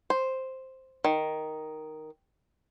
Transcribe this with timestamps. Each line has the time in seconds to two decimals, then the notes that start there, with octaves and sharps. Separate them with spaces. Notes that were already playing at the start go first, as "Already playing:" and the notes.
0.10 C5
1.04 D#3